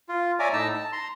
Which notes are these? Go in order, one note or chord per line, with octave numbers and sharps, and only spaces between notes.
F4
C#5 D5 E5 G#5 A#5 D6
A2 D#4 A5 A#5 E6
A5
A#5 C6